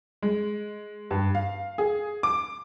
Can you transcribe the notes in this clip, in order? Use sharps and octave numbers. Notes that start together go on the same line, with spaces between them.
G#3
G2
F5
G#4
D6